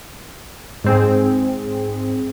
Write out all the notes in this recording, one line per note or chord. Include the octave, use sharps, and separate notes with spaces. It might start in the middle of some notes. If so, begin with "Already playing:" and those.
G#2 C4 G#4